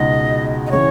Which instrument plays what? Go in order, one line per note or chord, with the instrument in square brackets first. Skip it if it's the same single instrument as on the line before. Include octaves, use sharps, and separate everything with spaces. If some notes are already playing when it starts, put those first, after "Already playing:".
Already playing: [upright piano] C#2 B2 G#3 D#4 F#4 [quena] D#5
[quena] D#5
[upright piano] C#3 E3 [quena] C#5